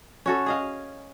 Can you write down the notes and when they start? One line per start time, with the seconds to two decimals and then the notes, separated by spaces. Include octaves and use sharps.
0.26 C#4 F#4 A4
0.46 G#4 D#5 F5